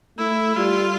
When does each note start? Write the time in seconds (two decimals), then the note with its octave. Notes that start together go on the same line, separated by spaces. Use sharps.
0.18 A3 E4
0.56 G3 F4